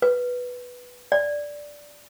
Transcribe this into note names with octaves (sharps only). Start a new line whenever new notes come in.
B4
D5